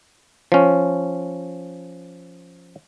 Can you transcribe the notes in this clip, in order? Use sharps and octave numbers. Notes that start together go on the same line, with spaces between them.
F3 C#4